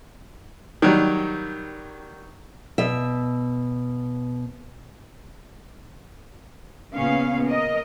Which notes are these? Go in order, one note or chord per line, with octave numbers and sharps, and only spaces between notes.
D#3 F#3 G3
B2 E5
A#2 C#3 B3 C#4 F5
A#4 D#5